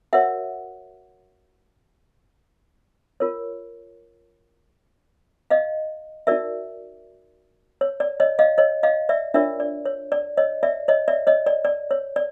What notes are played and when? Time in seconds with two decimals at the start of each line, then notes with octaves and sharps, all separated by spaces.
0.13 F#4 A#4 C#5 E5 F#5
3.20 F4 A#4 C#5
5.50 D#5 F5
6.27 D#4 F#4 A#4 D5 E5
7.81 C#5
8.00 D5
8.20 C#5 D#5
8.39 D#5 F5
8.58 C#5 D#5
8.83 D#5 F5
9.09 D5 E5
9.34 D4 F4 A#4 C#5 D5 E5
9.60 D5
9.86 C#5
10.12 D5
10.37 C#5 D#5
10.63 D5 E5
10.88 C#5 D#5
11.08 D5 E5
11.27 C#5 D#5
11.47 D5
11.65 D5
11.91 C#5
12.16 D5